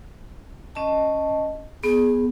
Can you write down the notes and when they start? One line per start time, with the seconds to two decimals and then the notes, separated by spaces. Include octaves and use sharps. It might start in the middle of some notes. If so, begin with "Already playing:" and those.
0.75 C#4 D#5 A5
1.84 B3 G#4